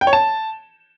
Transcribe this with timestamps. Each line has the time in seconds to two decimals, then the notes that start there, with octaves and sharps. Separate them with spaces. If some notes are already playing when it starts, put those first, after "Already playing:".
0.01 G5
0.07 C#5
0.13 A5